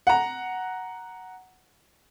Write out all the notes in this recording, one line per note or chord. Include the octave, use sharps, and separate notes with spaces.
F#5 A#5